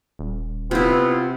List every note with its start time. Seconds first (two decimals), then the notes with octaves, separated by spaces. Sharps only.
0.19 D#1
0.71 C3 B3 E4 F4